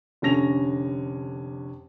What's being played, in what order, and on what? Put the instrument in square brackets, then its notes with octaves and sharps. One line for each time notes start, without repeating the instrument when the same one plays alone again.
[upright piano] F1 D3 C#4 A#6 F7